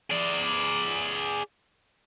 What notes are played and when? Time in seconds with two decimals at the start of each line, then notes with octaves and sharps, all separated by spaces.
0.10 G#4 D5